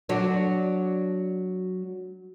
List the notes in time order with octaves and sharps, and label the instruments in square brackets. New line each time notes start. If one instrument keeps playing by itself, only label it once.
[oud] F#3 D4